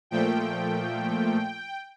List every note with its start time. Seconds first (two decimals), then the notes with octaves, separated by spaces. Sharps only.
0.11 A#2 F3 A3 G5